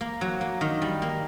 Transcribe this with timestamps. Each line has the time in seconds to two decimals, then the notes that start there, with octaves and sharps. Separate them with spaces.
0.01 A#3
0.21 F#3
0.41 A#3
0.61 D#3
0.82 G3
1.02 A#3